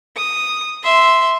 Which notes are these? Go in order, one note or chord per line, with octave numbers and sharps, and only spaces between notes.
D#6
E5 C6